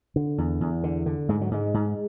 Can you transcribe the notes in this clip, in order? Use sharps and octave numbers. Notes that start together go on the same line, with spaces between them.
D3
E2
E2
D3
D3
G#2 G#3
F#3
G#2 G#3
G#2